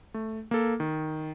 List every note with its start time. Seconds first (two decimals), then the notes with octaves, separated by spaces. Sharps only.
0.14 A3
0.51 A#3 A4
0.80 D#3